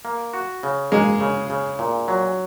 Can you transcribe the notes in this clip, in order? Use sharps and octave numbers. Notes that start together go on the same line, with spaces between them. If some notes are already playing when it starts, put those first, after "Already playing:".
A#3
F#4
C#3
G#3 A#3
C#3
C#3
A#2
F#3